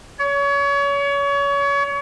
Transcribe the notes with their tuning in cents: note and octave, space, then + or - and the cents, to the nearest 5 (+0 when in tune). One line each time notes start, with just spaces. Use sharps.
C#5 +30